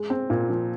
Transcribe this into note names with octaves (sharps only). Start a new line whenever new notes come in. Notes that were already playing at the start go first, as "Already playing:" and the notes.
Already playing: G#3
C4
A#2
F3